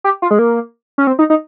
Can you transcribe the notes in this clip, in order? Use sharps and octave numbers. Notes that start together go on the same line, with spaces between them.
G4
F4
G#3
A#3
C#4
C4
D#4
D#4